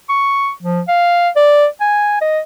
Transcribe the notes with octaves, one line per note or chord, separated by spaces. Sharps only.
C#6
F3
F5
D5
G#5
D#5